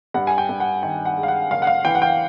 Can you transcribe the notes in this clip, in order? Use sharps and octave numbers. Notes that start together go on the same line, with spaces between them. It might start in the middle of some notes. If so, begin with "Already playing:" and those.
G2 F#5
G#5
G5
G2
F#5
D#3 G5
F#5
G#3
F5
F#5
F#1 F5
F#5
F5
E3 G5
F#5
G5